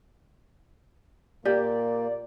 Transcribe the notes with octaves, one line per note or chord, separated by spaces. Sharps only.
A#2 A#3 G4 D5